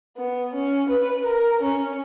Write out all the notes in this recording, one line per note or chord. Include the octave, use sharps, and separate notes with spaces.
B3
C#4
B4
A#4
C#4